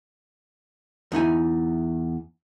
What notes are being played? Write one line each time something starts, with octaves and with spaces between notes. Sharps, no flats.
E2 D#4 E4 G#5